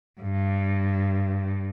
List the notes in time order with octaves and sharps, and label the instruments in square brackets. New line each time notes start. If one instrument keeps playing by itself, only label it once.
[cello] G2